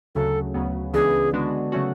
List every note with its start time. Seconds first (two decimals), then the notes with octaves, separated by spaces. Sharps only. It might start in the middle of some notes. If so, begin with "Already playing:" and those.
0.15 D2 C#3 F#3 A3 A4
0.54 D2 C#3 F#3 B3
0.93 C#2 C#3 E3 B3 D4 G#4
1.33 D3 G#3 B3 D4 F#4
1.72 C#3 F#3 A3 C#4 F#4